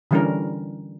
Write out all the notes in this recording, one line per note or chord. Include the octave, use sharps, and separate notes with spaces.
D3 E3 G3 C#4 D4 A#4